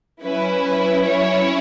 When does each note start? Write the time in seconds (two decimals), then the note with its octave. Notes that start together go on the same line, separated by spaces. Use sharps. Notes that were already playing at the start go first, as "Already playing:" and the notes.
0.23 F#3 C#4 E4 B4
1.05 C#5